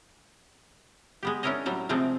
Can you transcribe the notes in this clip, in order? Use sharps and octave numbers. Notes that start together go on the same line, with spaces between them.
G#3 B3 G4
C#4 D4 E4 A#4 C#5 D#5
A2 F#3 G3
C3 F3 G#3 A3 C4